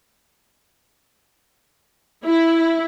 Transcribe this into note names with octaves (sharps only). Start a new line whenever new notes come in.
E4